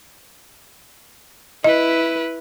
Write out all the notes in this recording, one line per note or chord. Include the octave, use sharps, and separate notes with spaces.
E4 B4 D#5